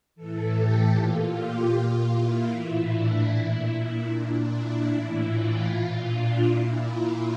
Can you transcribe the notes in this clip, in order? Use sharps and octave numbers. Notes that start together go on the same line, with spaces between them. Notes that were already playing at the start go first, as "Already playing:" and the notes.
A2 E3 A4
G4
A#2 F4
G4
A#2 F4
E4
A2 E3 E4
D4
A#2 E4
E4
A#2 D4
E4
A2 E3
F4
A#2
D4
A#2 E4
F4